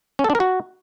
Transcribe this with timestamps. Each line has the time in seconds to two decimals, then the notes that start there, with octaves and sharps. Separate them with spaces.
0.19 C#4
0.24 A4
0.30 D4
0.35 A#4
0.40 F#4